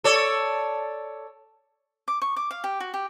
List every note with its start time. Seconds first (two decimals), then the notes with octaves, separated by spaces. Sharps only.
0.04 A4 C#5 D5
2.08 D6
2.22 C#6
2.36 D6
2.51 F5
2.64 G4
2.80 F#4
2.94 G4